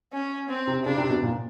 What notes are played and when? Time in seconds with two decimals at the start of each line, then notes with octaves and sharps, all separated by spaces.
0.13 C#4
0.49 C4
0.67 C3
0.85 C#3 D4
0.98 C3
1.09 B2
1.23 A#2